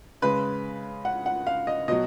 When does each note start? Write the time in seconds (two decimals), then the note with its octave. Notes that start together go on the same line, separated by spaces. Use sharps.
0.22 C#3 G#3 B4
1.05 F#5
1.26 F#5
1.47 F5
1.67 D#5
1.88 B2 D#5
1.91 F#3